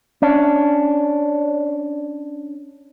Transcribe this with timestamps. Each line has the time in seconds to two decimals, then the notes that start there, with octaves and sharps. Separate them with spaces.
0.22 C#4 D4